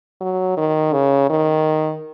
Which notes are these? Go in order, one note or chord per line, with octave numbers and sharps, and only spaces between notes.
F#3
D#3
C#3
D#3